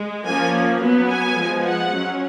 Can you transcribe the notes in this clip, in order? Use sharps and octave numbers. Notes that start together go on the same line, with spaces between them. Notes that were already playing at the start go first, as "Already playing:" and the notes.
Already playing: G#3
F3 A#3 C#4 G#5
F#3 B3
G#5
F3 G#3 B3
F#5
F#3 C#4